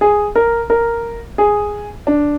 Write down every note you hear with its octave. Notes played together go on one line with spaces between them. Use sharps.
G#4
A#4
A#4
G#4
D4